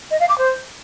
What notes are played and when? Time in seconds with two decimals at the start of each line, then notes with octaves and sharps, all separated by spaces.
0.11 D#5
0.20 F5
0.29 D6
0.38 C5